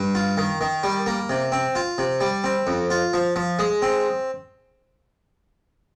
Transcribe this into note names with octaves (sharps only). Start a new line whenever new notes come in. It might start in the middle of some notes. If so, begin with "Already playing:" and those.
Already playing: G2
F4
D#3
D#3
G3
A#3
C3
C4
F4
C3
G3
C4
F2
F4
F3
F3
G#3
C4